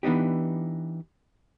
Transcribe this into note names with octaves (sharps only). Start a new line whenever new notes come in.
E3 B3 D4 D#4 G4